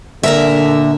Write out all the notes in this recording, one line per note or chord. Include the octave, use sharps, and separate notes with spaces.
A#2 D3 A#4 E5